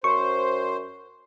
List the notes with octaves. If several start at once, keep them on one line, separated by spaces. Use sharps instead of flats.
F#2 C5 C#6